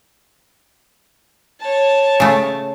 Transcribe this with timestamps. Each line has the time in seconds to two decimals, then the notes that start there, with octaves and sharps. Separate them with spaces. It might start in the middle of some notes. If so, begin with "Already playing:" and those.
1.61 C#5 A5
2.20 C#3 A3